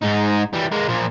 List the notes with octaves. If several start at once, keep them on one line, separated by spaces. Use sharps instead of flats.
G#2 D#4
E3 G3
G#3 A#3
A#2 F3